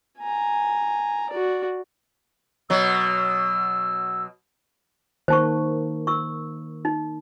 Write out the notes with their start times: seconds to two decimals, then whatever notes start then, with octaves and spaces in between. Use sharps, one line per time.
0.19 G#5 A#5
1.30 F#4 D5
2.70 B2 F#3 E6
5.28 D#3 A#3 D#4 C5 A5 C#6
6.07 C#6 E6
6.85 D#4